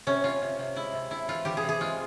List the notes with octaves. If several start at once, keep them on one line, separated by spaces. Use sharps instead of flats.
C3 C#4
C3 F4
C3
C3
G#3 E4
C3
C3 E4
E3 F4
E3 G4
G#4
C3
G#4
G#3 F4